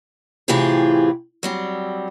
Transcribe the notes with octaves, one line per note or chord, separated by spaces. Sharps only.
A2 C3 E3 F4 G4 G#4
F#3 G3 C4